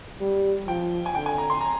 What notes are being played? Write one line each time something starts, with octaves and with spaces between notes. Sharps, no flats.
G3
F3 G5
G#5
D3 G5
G#5
A#5
C6
A#5